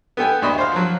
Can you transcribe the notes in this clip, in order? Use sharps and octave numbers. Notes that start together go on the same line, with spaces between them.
B3 G4 A4 G5 G#5
D2 F#4 D#5 B5
C5 F5
F3 F#3